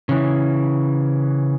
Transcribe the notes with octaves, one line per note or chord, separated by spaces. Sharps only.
C#3 E3